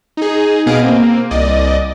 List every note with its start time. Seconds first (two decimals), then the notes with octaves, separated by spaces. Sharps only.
0.17 D#4 G#4
0.66 B2 B3 G#4 D#5 F5 D7
0.83 A#3 C4
1.31 C2 D5 D#5